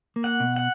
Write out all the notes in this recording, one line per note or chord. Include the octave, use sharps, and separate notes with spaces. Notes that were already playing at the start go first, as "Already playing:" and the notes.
A#3
F#5
B2
F#5